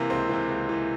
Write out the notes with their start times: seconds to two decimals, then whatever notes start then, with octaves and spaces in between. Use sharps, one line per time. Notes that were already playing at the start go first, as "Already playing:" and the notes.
Already playing: C3 E3 A#3
0.10 C#2 C4
0.29 C3 E3
0.49 C#2
0.69 C3 E3